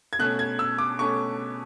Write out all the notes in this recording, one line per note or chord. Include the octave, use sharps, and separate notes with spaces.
G#6
B2 A3 C#4 F#6
G#6
E6
D6
B2 A3 C#4 C#6